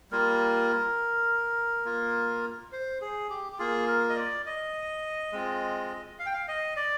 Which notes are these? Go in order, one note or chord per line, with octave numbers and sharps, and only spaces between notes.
G3 A#3 F4 A#4
A#3 F4
C5
G#4
G4
G4
A#3 F4 G#4
A#4
D#5
D5
D#5
G#3 C4 F4
F5
G5
F5
D#5
D5